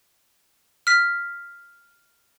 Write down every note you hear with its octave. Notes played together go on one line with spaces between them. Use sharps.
F6 B6